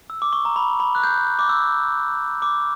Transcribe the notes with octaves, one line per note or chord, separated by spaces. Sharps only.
E6
D6
C#6
A#5
B5
B5
F#6
G6
D6
E6
D6